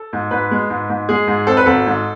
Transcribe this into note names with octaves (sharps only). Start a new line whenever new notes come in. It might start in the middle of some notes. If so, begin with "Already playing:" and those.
Already playing: A4
G#2
G#2 B4
G#3
G#2
G#2
G#3 G#4
G#2
C4 A4
B4
G#1 A4
G#2